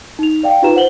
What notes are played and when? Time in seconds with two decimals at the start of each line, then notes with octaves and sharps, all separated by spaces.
0.19 D#4 F7
0.43 D5 F5 G5
0.62 D#4 F4 G4 B4 A#5 E7
0.75 C5 F#5 F#7 G7